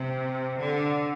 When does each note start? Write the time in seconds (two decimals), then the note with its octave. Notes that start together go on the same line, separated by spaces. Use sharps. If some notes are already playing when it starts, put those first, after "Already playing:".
Already playing: C3
0.59 D3